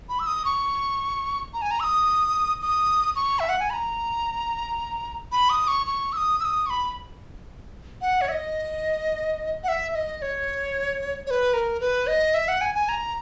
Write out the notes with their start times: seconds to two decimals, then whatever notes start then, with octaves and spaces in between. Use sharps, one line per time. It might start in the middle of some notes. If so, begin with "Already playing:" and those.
0.09 B5
0.19 E6
0.27 D#6
0.45 C#6
1.54 A#5
1.62 G#5
1.71 A#5
1.80 E6
1.84 D#6
2.62 D#6
3.16 C#6
3.40 E5
3.49 F#5
3.60 G#5
3.70 B5
3.73 A#5
5.32 B5
5.50 D#6
5.68 C#6
5.86 C#6
6.13 E6
6.17 D#6
6.40 E6
6.45 D#6
6.66 C#6
6.70 B5
8.01 F#5
8.21 C#5
8.29 E5
8.32 D#5
9.64 F#5
9.68 E5
9.92 E5
9.95 D#5
10.18 D#5
10.22 C#5
11.27 C#5
11.31 B4
11.54 A#4
11.81 B4
12.07 D#5
12.34 E5
12.48 F#5
12.61 G#5
12.75 G#5
12.89 A#5